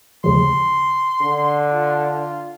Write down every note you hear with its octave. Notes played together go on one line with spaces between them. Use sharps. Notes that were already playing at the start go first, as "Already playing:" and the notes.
D#2 C#3 F3 C6
D3
F4